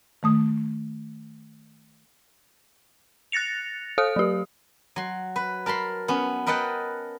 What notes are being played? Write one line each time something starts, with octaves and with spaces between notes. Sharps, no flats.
D#3 A3 D#6
F#6 A6 A#6 C#7 F7
A4 F5 D#6
F#3 G4
F#3 C6
B4
A#4 A5 B5 C6
B3 C#4
A#4 B4 D#5 F#5 G5 A5